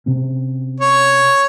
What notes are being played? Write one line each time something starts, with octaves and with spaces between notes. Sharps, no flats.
C3 C4 C#4
C#5